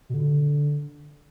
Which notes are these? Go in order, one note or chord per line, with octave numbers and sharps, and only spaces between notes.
B2
D3